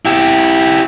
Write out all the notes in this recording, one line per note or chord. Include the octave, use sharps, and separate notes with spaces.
E4 G4